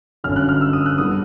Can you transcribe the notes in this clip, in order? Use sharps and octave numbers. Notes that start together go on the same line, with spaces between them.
G1 F#2 D3 F6
F#6
F6
E6
D#6
F#6
D3 G3 B3 D#6